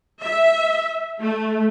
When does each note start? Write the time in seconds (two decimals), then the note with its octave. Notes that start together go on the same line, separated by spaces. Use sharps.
0.22 E5
1.20 A3